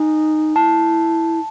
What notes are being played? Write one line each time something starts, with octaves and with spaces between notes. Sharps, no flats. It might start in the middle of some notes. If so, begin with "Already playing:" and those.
Already playing: D#4 G#5
E4 A5